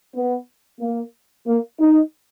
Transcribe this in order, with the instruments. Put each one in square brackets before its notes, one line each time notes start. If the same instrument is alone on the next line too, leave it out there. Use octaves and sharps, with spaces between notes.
[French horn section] B3
A#3
A#3
D#4